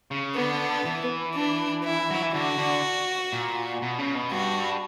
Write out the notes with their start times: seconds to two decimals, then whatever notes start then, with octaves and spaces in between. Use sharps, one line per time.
0.11 C#3
0.36 D3 B3
0.85 E3
1.35 D4
1.84 E4
2.11 F#3
2.22 E3
2.33 D3 F#4
2.58 D3
3.33 A#2
3.82 B2
3.99 C#3
4.15 B2
4.31 G2 F#4